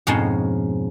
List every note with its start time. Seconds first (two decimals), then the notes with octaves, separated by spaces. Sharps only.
0.07 F2 G#2 B2 F3 G#3 C#4